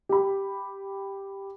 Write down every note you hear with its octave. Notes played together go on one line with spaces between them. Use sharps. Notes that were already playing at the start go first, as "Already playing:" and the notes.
G4 B5